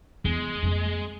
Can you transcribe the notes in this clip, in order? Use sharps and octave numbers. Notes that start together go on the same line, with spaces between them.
E2 G#3
F2 A#3